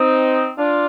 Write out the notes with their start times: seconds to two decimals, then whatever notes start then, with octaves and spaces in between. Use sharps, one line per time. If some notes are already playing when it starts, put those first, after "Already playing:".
Already playing: C4 D#4
0.58 D4 F4